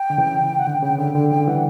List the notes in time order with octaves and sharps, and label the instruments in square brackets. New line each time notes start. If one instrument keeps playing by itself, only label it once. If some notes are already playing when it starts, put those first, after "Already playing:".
Already playing: [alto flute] G5
[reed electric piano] D3
C#3 E3
[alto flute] F#5
[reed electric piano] D3 [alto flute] G5
[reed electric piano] C#3 [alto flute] G5
[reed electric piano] D3 [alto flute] G5
[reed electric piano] D3 [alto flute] G5
[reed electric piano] C#3 E3 [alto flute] G5
[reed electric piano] E3 G3 [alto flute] F#5